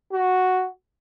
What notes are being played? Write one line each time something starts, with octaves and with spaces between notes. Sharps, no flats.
F#4